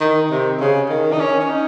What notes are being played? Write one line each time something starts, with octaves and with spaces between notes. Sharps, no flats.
D#3
C3
C#3
D#3
D#4
C#4
C#4
D#4